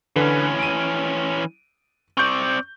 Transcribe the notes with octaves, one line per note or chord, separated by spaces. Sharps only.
D3 E3 C#4 B4
D7 D#7
C4 D5 C#6 G6